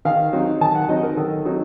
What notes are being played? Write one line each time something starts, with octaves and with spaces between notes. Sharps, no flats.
D#3 F5
F#3 C4 D#4
D#3 A5
F#5
F#3 C4 D#4 D#5
A#4
D#3 A4
F#3 C4 D#4